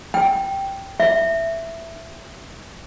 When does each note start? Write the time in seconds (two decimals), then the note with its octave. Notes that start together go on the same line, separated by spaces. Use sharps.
0.14 G5
1.00 E5